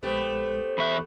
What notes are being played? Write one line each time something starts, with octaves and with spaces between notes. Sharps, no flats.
A#1 G#3 A3 B3 G4 C5
E2 E5 B5 C#6 F#6